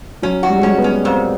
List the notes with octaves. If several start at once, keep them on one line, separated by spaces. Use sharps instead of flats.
F#3 C#4
F#4
G3
G#3
G3 C#4
B3
C#4
A#2 C4